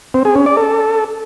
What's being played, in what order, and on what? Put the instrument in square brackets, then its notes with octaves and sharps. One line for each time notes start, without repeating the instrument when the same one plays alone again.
[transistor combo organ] C4
G#4
C#4
D5
A4